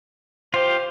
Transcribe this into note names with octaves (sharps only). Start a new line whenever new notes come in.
F4 G4 C5